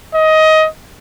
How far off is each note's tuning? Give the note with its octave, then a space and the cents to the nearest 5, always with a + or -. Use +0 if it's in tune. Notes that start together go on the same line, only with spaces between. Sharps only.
D#5 +15